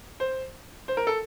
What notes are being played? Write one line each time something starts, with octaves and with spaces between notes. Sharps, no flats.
C5
C5
A#4
A4